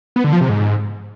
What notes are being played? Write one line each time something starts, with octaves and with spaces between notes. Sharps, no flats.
B3
D3
F3
C3
G#2